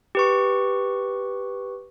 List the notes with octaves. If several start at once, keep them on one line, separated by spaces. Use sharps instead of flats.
G4 B4 C#6